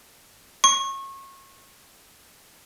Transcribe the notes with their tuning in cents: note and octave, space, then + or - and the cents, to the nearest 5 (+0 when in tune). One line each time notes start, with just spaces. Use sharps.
C#6 -30